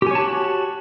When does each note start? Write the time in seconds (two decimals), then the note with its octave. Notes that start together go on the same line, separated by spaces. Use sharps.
0.02 G4
0.07 G#5
0.11 C#5
0.15 A5
0.20 F#4